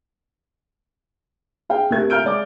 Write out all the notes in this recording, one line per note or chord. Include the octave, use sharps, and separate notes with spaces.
G#4 F5 G5
A3 C4 G4 A#4 E5 G#6
E5 F5 A#5 F6 G6 D7
G#3 D5 D6